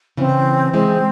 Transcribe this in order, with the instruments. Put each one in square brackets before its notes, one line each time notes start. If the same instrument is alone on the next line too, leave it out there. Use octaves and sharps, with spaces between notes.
[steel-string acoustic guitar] C#3 E3 [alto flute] C4
[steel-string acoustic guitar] E3 G#3 [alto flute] C4